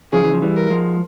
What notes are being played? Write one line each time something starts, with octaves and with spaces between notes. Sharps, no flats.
C#3 F3 G#4
E3
F3
E3 G3
A#4
F3 G#3